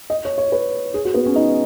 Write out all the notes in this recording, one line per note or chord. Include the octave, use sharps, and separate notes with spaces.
D#5
C#5
C#5
B4
G#4
F#4
B3
C#4
D#4